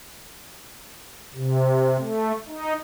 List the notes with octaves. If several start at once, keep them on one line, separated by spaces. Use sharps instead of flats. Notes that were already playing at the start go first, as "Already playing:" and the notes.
C3
A3
D#4